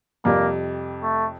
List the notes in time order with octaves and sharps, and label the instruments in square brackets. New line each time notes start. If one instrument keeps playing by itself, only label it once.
[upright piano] F2 C3 G3 [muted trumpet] A#3
[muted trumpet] A3